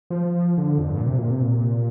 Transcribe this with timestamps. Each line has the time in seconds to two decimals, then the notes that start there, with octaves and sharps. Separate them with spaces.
0.10 F3
0.58 D3
0.78 F2
0.88 G2
0.97 A#2
1.07 C3
1.18 A#2
1.30 C3
1.42 A#2